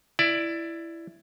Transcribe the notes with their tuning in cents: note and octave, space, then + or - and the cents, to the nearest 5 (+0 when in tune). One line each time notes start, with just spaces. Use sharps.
E4 +10 D5 +10